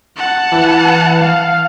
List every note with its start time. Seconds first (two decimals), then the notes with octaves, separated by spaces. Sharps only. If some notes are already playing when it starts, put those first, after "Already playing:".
0.17 F#5 A5
0.52 E3
1.21 F5